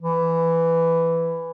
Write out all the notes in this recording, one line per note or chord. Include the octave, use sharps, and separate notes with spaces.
E3